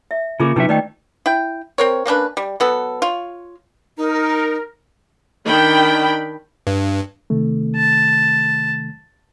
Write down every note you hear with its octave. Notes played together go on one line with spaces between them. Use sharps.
E5
C#3 A#3 F4 G#4 D6
C3 F#3 C#4 D#4 B4 E5
D#3 A3 D#4 D5 D#5 G5
E4 G5
C4 A#4 C#5
A#3 C#4 D4 B4
G3
F#3 B3 A4
F4 C#5
D#4 A#4
D#3 D4 G5 B5
G2
C3 D#3 A3
A5